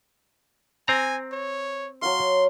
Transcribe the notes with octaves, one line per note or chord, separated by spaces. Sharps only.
C4 G#5 A#5
C#5
F#3 C#5 F5 C6